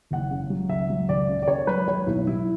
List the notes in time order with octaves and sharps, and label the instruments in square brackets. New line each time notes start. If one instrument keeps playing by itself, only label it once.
[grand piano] F#1 F#5
C#3
F#3
C#2 E5
F#3
C#2 D5
C#3
D5
C#3 C#5
F#3 B4
F#3 C#5
B1 E4
F#3 E4